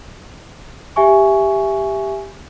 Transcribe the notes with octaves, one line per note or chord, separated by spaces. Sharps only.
G4 E5 G#5 C#6